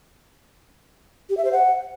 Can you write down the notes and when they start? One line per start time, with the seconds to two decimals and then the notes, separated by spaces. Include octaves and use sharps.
1.30 G4
1.37 E5
1.45 C5
1.53 F#5